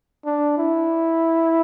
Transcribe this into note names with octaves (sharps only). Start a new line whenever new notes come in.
D4
E4